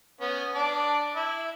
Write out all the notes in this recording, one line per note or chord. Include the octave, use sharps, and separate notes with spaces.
B3 C#4
D4 D5 A5
E4